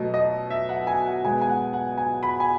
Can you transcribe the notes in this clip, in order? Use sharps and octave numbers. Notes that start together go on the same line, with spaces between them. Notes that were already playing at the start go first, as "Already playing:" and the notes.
Already playing: B2 F#3 A3 D#5
D#5
E5
F#5
G#5
F#5
B2 G#3 B3 G#5
G#5
F#5
F#5
G#5
B5
G#5